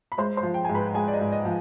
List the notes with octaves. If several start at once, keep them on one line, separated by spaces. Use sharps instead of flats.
B5
G#3 C5 C6
C5 C6
F3
G5
G#2 G#5
B4 B5
G#3 G#4 G#5
D5
D#5
G#2
D#5
F3